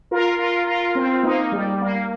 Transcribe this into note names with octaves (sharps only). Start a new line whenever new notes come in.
F4 A#4
F4 A#4
F4 A#4
C4 F4
A#3 D#4
G3
A#3